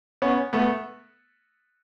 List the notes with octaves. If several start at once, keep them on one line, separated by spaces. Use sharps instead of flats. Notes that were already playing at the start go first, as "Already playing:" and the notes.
B3 C#4
A3 B3